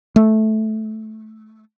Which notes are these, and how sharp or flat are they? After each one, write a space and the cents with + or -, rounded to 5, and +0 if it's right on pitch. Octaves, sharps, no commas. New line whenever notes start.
A3 -10